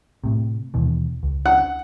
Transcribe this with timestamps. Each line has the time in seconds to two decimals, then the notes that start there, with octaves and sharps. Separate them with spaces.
0.24 A2 C3
0.74 D#2 B2 E3
1.23 C#2
1.46 F#5